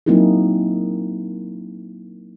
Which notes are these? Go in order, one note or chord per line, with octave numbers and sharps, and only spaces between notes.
F#3 A#3 C4 D#4 E4 G#4